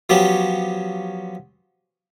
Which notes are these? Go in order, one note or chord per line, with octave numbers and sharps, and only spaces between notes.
F3 F#3 B3 C#4 G4